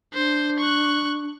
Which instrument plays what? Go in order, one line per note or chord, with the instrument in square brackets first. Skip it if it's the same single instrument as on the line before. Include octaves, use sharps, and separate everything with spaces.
[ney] D4 [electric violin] C5
[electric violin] C#6 F#6